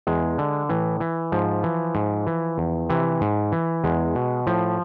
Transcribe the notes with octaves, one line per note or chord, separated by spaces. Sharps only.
E2 G#3
D3
A2 E3
E3
G#2 F3
E3
G#2
E3
E2
C3 E3
G#2
E3
E2 G#3
B2
A2 F3